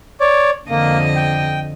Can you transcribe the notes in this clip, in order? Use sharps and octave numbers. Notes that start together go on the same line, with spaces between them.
C#5 D5
F2 D3 A#3 D#5
G5